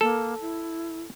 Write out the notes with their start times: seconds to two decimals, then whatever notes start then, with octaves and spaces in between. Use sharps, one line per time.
0.01 A#3 A4
0.41 E4